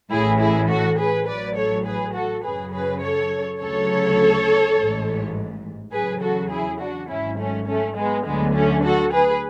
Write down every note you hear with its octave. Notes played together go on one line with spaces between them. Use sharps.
A1 A2 E3 E4 G#4
E4 G#4
F#4 A4
G#4 B4
A1 A2 F#3 B4 D5
A4 C#5
G#4 B4
F#4 A4
F#2 C#3 F#3 G#4 B4
G#4 B4
A4 C#5
D2 C#3 F#3 A4 C#5
A1 G#2 E3
E2 C#3 F#3 G#4 B4
F#4 A4
E4 G#4
D4 F#4
G#1 G#2 F#3 C#4 E4
A3 C#4
A3 C#4
G#3 B3
D2 D3 F#3 G#3 B3
A3 C#4
F#4 A4
G#4 B4